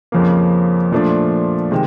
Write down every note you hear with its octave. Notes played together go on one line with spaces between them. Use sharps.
F2 C#3 F3 A#3
A#2 F3 A3 D4
C3 D#3 G#3